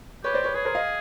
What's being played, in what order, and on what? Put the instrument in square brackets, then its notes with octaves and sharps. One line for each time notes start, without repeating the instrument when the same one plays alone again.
[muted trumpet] G4 [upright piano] B4 C#5
[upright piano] C5 D5
B4 C#5
[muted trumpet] G#4 [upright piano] B4 C#5
[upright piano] A#4 C5
D#5 F5